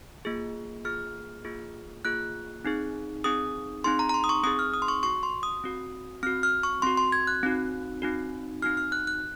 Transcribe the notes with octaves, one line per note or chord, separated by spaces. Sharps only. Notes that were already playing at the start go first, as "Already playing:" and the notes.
A#3 F4 G#4
A#3 F4 G#4 F6
A#3 F4 G#4
A#3 F4 G#4 F#6
C4 D#4 G#4
C4 D#4 G#4 D#6
C4 D#4 G#4 C6
A#5
A#5
C6
D#6
C#6
C4 D#4 G#4 D#6
F6
D#6
C6
C#6
C4 F#4 C#6
C6
D#6
C4 F#4
C4 F#4 F6
F6
C#6
C4 F#4 C6
C6
G#6
F#6
C4 D#4 F#4
C4 D#4 F#4
C4 D#4 F#4 F6
F6
F#6
F#6